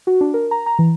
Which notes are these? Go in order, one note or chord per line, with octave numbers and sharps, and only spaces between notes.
F#4
D4
A#4
A#5
A#5
E3